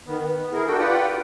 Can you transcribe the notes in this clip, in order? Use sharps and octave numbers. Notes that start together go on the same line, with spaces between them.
D#3 B3
B3
E4 G#4 A#4
D4 F#4 A4 G5
F4 G4 B4 D5 F#5 G5